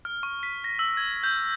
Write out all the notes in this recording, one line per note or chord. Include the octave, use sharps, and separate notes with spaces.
F6
C#6
B6
A#6
E6
G#6
G6